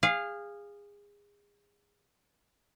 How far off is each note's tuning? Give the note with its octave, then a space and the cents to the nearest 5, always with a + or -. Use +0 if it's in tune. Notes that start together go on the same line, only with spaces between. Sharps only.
G#4 -25 F5 +0